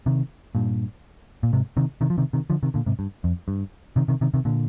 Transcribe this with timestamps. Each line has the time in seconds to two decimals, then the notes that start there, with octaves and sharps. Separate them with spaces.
0.06 C3 D#3
0.55 G2 A#2
1.43 A#2
1.53 G#2 C3
1.77 C3 D#3
2.01 C3 D#3
2.10 F3
2.18 C3 D#3
2.33 C3 D#3
2.50 D3 F3
2.63 C3 D#3
2.74 A#2 D3
2.86 G#2 C3
2.99 G2
3.24 F2
3.48 G2
3.96 C3 D#3
4.08 C3 D#3
4.21 C3 D#3
4.34 C3 D#3
4.45 A#2 D3